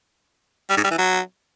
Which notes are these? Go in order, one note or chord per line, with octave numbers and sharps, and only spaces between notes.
G3
G#2
G3
E3
F#3